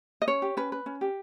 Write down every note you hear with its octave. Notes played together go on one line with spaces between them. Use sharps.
D#5
C#4 C#5
G4
C#4 B4
B4
C#4
G4